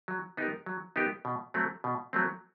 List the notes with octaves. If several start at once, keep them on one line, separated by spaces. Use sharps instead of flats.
F#3
B3 D#4 G4 A#4
F#3
B3 D#4 G4 A#4
B2
F#3 A3 C4
B2
F#3 A3 C4